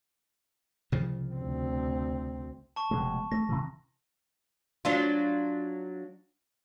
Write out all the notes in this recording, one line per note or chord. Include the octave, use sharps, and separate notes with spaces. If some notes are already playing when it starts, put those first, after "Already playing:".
C2 C#3 F3
D2 C4
A5 C#6
F1 B2 G#3
A3 A#6
C3 E3
F#3 D4 F4